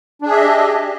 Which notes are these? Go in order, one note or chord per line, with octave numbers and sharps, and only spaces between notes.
D4 G4 G#4 D#5 E5